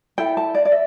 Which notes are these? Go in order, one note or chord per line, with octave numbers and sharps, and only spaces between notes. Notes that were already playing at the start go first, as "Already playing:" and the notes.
E4 A4 G5
A5
D5
D5
E5